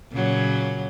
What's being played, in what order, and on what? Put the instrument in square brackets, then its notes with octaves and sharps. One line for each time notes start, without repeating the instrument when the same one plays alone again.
[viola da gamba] A#2 C#3 F#3